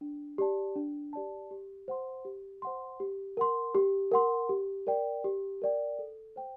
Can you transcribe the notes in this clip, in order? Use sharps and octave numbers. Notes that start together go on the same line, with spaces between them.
D4
G4 D5 A5
D4
G4 D5 A5
G4
C5 F#5 C6
G4
C5 F#5 C6
G4
A#4 F#5 C6
G4
A#4 F#5 C6
G4
A#4 D5 G5
G4
A#4 D5 G5
A4
C5 G5